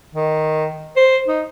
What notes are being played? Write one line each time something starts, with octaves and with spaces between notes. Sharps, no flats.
D#3
C5
D#4